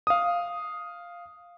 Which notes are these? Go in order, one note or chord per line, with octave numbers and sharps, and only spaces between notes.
F5 D#6